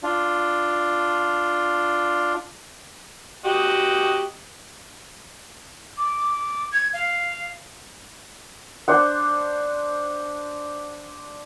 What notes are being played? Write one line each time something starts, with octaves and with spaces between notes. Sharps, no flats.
D4 F4
F#4 G4 D#5
D6
G#6
F5
D4 C5 F#5